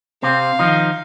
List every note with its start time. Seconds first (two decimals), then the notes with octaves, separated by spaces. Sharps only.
0.23 C3 C4 F5
0.59 D#3 F3 D#4